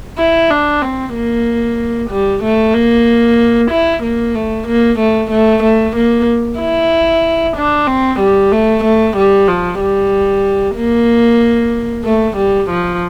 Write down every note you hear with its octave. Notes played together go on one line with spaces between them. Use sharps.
E4
D4
C4
A#3
G3
A3
A#3
E4
A#3
A3
A#3
A3
A3
A3
A#3
E4
D4
C4
G3
A3
A3
G3
F3
G3
A#3
A3
G3
F3